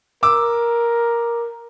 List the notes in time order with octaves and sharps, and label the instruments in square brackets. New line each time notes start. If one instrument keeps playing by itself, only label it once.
[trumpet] A#4 [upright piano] D6 E6